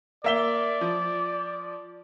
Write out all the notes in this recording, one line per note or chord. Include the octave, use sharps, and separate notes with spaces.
A#3 D5 E5 G7
F3